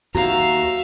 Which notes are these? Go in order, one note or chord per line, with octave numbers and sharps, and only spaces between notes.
D#2 F#4 E5 F5 A#5